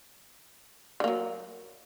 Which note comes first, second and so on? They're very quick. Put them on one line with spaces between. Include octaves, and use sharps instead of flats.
D3 A#3 F#3